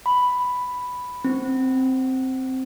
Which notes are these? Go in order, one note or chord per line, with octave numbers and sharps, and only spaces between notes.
B5
C4